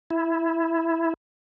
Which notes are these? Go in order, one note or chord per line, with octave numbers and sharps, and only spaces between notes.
E4